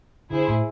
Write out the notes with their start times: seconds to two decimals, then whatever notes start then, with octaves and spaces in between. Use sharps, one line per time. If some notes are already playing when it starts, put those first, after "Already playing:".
0.30 D3 E4 G#4 C5
0.48 A2